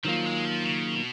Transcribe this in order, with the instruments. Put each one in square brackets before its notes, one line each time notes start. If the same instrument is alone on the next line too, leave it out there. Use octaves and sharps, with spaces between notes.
[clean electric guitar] D#3 F#3 A#3 F4 [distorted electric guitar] F3
[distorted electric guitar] G#3
F3
C#3
B2